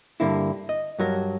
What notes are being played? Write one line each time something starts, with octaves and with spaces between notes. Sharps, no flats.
G2 D3 A#3 E4
D#5
G2 F#3 A#4